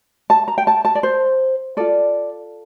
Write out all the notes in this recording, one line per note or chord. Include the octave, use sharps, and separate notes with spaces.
A5
A#5
G5
A5
A5
D5
C5
F4 A4 D5